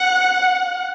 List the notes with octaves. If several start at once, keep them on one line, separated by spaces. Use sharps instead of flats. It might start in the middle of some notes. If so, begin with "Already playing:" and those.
Already playing: F#5 F#6